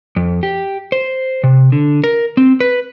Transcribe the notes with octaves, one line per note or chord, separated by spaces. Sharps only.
F2
G4
C5
C3
D3
A#4
C4
B4